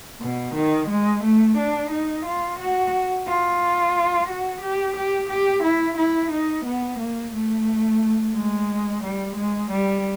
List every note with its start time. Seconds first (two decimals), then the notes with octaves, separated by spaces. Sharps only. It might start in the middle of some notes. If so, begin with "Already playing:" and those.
0.21 B2
0.55 D#3
0.89 G#3
1.24 A3
1.58 D4
1.91 D#4
2.26 F4
2.59 F#4
3.27 F4
4.29 F#4
4.62 G4
4.97 G4
5.30 G4
5.64 E4
5.98 E4
6.32 D#4
6.65 B3
6.99 A#3
7.33 A3
8.35 G#3
9.03 G3
9.36 G#3
9.71 G3